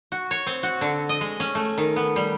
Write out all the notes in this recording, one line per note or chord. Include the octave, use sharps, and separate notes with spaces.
F#4
C#5
C4
F#4
D3
D#5
G#3
C#4
A3
D#3
B3
G3